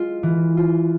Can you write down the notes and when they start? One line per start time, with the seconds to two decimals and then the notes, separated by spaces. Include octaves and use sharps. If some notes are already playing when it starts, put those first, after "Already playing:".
Already playing: G#3 F4
0.23 E3
0.57 F4